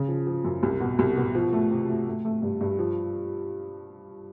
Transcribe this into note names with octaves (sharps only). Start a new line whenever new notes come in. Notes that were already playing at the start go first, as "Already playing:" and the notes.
Already playing: C#3
F3
F3
F#2
C2
B2
C2
B2
F3
A3
C3
A3
A3
A3
G2
G2
F3